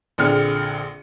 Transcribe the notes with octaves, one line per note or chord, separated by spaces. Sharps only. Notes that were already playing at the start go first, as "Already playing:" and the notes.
A#1 D3 C4 G#4 F6 C#7